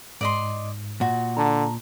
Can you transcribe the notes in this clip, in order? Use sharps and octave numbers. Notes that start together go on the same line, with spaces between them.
G#2 D5 D#5 C6
A#2 F#4
D3 A5 A#5